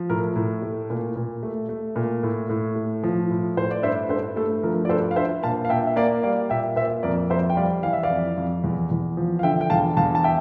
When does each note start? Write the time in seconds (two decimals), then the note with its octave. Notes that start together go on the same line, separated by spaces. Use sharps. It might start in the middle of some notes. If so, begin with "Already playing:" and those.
Already playing: F3
0.09 A2 A#4
0.35 A2
0.62 A3
0.90 A#2
1.16 A#2
1.43 A3
1.69 A3
1.96 A#2
2.23 A2
2.49 A2
2.76 A3
3.03 F3
3.30 A2
3.56 A2 C5
3.71 D5
3.82 G2 C5 E5
4.09 G2 A4 C5
4.36 A3 A4
4.63 F3 A#4
4.85 D5
4.89 G2 A4 C5
5.11 F5
5.16 G2 C5 E5
5.43 A#2 F5 A5
5.65 F5
5.69 A#2 E5 G5
5.87 E5
5.96 A#3 D5 F5
6.23 G3 D5 F5
6.49 A#2 E5 G5
6.76 A#2 C5 E5
7.03 F2 A#4 D5
7.30 F2 C5 E5
7.50 G5
7.57 G3 D5 F5
7.83 E3 F5
7.93 E5
8.03 D5 F5
8.10 F2
8.37 F2
8.64 E2
8.91 E2
9.17 F3
9.39 F5
9.43 D3 E5 G5
9.61 G5
9.70 E2 F5 A5
9.97 E2 F5 A5
10.15 A5
10.24 E5 G5